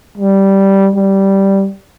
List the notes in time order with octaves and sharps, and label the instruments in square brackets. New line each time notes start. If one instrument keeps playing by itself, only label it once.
[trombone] G3
G3